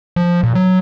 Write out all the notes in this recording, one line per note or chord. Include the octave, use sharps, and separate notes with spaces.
F3
A#2
F#3